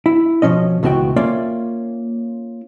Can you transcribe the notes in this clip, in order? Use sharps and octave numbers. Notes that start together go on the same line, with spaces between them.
E4
B2 F3 C#4 D#5
C#2 B2 E3 F#4 E5 G5
A#3 C#4 F4 D5 E5